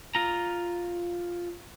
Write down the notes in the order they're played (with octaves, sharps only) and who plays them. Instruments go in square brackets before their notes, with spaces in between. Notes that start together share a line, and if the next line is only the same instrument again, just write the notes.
[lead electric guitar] F4 A#5